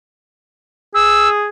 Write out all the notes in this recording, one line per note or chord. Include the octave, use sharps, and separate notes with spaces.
G#4 E6